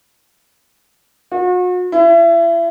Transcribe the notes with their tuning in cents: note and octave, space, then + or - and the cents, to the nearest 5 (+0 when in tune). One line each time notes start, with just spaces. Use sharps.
F#4 -40
E4 +35